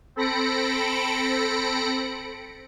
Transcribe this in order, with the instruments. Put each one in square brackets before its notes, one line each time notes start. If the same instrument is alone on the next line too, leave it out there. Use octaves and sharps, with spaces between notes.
[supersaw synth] C4 A4 B5 A#6 C#7 D7